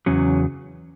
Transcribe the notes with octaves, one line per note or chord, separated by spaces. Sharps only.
E2 C#3 F#3 C#4